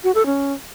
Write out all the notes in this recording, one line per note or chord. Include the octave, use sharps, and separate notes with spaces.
F#4
A4
C#4